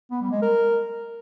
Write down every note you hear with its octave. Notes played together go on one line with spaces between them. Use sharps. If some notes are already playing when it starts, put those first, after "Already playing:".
B3
G3
G#3
A#4